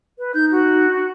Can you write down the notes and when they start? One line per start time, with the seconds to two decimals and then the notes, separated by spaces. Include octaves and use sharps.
0.19 B4
0.34 D#4 G6
0.51 F#4